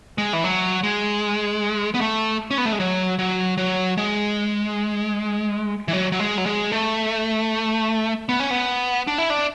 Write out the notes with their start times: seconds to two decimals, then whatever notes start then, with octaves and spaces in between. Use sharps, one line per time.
0.18 G#3
0.33 E3
0.44 F#3
0.83 G#3
1.94 B3
2.01 A3
2.51 C#4
2.58 B3
2.65 A3
2.73 G#3
2.80 F#3
3.19 F#3
3.58 F#3
3.97 G#3
5.88 E3
5.93 F#3
6.12 F#3
6.19 G#3
6.38 F#3
6.46 G#3
6.72 A3
8.29 B3
8.40 C#4
8.50 B3
9.07 D4
9.18 E4
9.30 D4